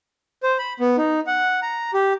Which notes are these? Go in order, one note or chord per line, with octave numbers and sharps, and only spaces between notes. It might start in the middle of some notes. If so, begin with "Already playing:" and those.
C5
B5
B3
D#4
F#5
A#5
G4